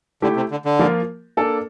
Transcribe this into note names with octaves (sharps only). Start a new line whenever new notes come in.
D3 A3 E4 G4
C3
D3
D3
F3 A#3 F4 A#4
A#3 D4 A4 D5